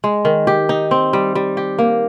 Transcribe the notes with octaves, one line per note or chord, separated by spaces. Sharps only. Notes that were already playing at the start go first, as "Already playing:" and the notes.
G#3
D#3
G4
D#4
C4
G3
G3
G4
A#3